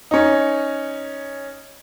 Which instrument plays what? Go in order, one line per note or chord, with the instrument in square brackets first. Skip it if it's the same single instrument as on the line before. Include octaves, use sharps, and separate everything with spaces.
[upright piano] C#4 D#4